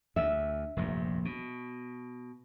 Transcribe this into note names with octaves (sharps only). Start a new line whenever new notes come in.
D2 E5
F1 A#1 G2
B2